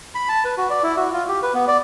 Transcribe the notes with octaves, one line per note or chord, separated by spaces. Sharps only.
B5
A5
B4
F#4
D5
E4
F#4
F4
G4
B4
B3
D5